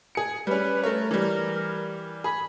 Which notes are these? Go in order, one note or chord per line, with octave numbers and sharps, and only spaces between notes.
G#4 C#7
G3 C#4 B4
A3 A#4 C#5
E3 G3
G#4 B5